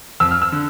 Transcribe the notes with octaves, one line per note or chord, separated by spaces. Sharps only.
F2 E6
F6
E6
D3